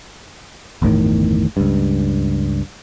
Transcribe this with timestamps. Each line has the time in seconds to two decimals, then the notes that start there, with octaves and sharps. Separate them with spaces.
0.82 G1 E2 A2 D#3
1.57 C#2 G2